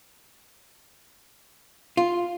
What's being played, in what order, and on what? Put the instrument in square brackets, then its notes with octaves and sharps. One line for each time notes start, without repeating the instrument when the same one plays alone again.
[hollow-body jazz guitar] F4